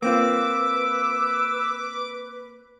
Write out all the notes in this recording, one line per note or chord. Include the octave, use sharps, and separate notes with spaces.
A#3 C4 F4 B4 D6 E6